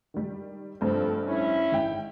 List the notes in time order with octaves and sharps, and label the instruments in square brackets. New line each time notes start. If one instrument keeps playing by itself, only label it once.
[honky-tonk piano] D#3 G3
[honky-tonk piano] F1 G2 C5 [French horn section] F3 C4 A4
[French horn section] C#4 E4
[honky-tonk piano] G#1 G#2 G5